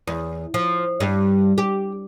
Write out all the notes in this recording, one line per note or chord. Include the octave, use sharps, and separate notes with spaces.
E2
F3
G2
G4